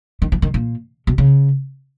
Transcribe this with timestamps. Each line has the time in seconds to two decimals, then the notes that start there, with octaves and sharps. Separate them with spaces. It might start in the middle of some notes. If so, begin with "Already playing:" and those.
0.22 D#3
0.32 E3
0.42 D#3
0.54 A#2
1.07 B2
1.18 C#3